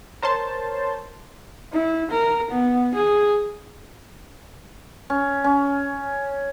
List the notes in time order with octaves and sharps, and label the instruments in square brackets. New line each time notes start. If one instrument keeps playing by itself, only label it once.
[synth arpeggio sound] A#4 C5 C#5 A5 C6
[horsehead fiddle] E4
A#4
B3
G#4
[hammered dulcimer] C#4
C#4